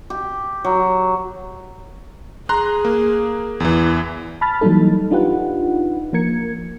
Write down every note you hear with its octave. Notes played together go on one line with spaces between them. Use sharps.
G4
F#3
G#4 A#5 C6 F#6
A#3
E2 E3
A5 B5 F6 A6
E3 F#3 G3 A#3 D#4 A4
D4 D#4 F4 G4 B4 F#5
F3 A#3 A#4 G#6 C#7